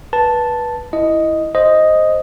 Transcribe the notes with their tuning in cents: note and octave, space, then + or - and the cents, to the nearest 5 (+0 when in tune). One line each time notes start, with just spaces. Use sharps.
B4 -20 A5 +0
E4 +0 D#5 +0
C5 +0 D#5 +0